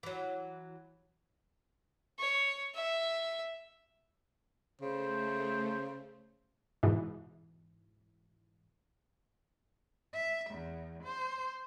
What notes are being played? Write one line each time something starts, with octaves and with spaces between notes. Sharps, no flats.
E3 F#3
C#5
E5
C#3 A3 C5
G#2 B2 E3
E5
E2
C5